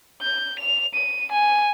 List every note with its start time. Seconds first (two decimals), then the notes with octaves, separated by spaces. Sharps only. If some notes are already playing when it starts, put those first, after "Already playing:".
0.22 G6
0.59 F7
0.94 D#7
1.31 G#5